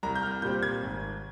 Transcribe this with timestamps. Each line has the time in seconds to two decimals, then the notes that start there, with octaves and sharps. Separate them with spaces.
0.03 C2 A#5
0.15 G6
0.23 F6
0.42 A#2 G3 C4 G6
0.63 G#6
0.83 G#1